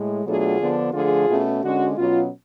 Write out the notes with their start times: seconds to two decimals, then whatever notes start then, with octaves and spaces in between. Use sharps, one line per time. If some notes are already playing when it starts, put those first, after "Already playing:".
Already playing: A2 G#3
0.25 B2 F#3 A3 D4 F4 G#4
0.59 D3 F3 B3 D4
0.93 D3 F3 A3 F4 G#4
1.28 B2 A3 C#4
1.62 D3 G#3 C#4 F#4
1.96 B2 F#3 C#4 F4